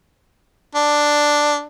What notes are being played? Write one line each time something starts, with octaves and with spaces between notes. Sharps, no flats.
D4